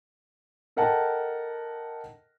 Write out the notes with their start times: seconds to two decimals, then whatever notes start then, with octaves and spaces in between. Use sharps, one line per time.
0.77 A4 A#4 D#5 F#5 G5 A5